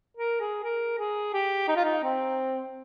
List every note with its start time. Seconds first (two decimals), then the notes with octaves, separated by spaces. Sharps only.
0.17 A#4
0.40 G#4
0.63 A#4
0.98 G#4
1.33 G4
1.68 D#4
1.76 F4
1.84 D#4
2.03 C4